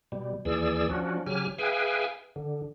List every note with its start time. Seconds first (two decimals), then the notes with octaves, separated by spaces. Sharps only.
0.12 B2 G3
0.45 D#2 E3 G#4 D5 E6
0.89 F3 C#4 D4 F#4
1.26 C#3 F#3 G4 G#5 F6
1.58 G#4 B4 E5 F5 G5 G#5
2.36 D3